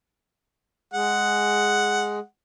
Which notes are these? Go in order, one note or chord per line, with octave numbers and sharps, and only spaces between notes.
G#3 G#4 F#5